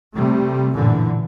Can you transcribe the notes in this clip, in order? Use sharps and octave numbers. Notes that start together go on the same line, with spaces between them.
C3 G3 A3
A1 F#2 A#2 D3 E3